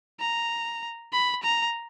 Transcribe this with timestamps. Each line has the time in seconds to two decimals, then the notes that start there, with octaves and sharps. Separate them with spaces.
0.20 A#5
1.13 B5
1.43 A#5